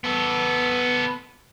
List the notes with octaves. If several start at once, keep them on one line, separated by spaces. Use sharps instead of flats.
B3 A4